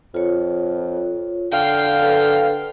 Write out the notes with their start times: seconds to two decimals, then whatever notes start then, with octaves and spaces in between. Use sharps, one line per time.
0.14 F2 F4 C#5
1.53 D3 F5 G5
2.02 A4 B4